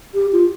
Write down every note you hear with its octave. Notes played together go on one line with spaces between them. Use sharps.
G4
F4